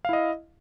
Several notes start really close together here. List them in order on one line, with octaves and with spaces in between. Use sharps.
F5 E4 D#5